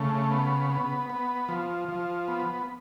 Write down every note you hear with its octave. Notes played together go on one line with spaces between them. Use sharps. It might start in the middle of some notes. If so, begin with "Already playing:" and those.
Already playing: C#3 A3
B3
B3
B3
F3
F3
B3